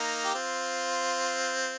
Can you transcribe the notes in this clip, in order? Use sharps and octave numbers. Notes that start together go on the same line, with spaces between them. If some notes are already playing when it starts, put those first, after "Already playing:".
Already playing: A#3 D#4
G4
C4 F4